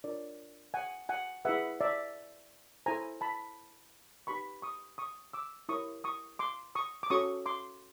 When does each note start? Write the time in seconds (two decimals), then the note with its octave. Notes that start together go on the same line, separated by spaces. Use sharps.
0.04 D4 F4 A#4 C#5 D5
0.74 F#5 G#5
1.09 F#5 G#5
1.45 E4 G#4 B4 E5 F#5
1.80 D5 E5
2.86 E4 A4 C5 G#5 A#5
3.21 A5 B5
4.27 D#4 G4 B4 B5 C#6
4.62 C#6 D#6
4.98 C#6 D#6
5.33 D6 E6
5.69 E4 G4 A#4 C#5 C#6 D#6
6.04 C#6 D#6
6.39 C6 D6
6.75 C#6 D#6
7.03 D6
7.10 C#4 F#4 A4 C#5 C#6 D#6
7.46 C6 D6